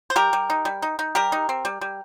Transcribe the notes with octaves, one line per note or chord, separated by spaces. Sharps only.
C5
G3 G4 A#4
G3
D#4
G3
D#4
D#4
G3 G4 A#4
D#4
C4
G3
G3